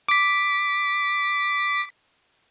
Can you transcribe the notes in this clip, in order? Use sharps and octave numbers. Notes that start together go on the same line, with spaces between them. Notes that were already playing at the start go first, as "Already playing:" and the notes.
D6 B6